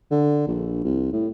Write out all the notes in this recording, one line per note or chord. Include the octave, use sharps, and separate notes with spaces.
D3
A#1
C2
A2